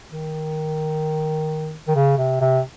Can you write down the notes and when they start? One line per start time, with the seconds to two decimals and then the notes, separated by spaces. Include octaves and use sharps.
0.11 D#3
1.88 D#3
1.95 C#3
2.18 C3
2.41 C3